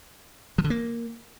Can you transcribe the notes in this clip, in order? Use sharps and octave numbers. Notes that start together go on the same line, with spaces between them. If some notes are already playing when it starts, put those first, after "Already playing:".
F3
D3
A#3